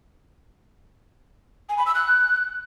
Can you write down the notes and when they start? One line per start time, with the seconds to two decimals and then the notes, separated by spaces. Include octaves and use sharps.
1.69 G#5
1.78 B5
1.86 E6
1.95 F#6